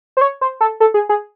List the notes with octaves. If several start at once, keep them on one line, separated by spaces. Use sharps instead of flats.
C5
C#5
C5
A4
A4
G#4
G#4